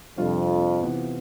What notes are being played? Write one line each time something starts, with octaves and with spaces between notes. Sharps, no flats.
F2 C3 G3 D4 F4
C3 E3 B3 F4